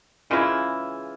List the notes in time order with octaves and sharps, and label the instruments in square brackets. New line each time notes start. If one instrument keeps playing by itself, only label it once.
[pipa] C#3 E3 G#3 E4 [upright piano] F4